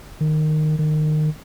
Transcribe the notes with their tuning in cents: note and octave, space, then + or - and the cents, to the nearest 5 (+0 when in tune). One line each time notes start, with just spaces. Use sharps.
D#3 -15
D#3 -25